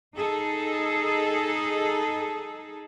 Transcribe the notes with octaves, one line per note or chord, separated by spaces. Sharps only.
D#4 G#4 A4